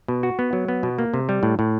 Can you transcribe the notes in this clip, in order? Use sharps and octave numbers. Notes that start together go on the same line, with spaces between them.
B2
F#4
B3
F#3
B3
B2
A#3
C3
G3
A2
A2